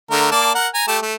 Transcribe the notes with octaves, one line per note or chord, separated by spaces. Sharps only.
D3 A3 A#4
A#3 D5 A5
A#4 F#5
G#5 A#5
A3 G4 A5
A3